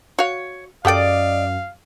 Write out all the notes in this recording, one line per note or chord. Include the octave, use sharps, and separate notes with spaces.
F#4 C#5 F5
F#2 G4 A4 D5 D#5 F5 G5